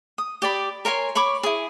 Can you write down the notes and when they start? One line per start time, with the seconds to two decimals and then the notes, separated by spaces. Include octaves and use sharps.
0.18 D#6
0.42 G4 D5 B5
0.85 A#4 C#5 G#5 C6
1.15 C#5 B5 C#6 D6
1.43 E4 G#4